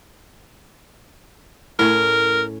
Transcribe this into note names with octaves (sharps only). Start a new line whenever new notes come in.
A2 C#4 A#4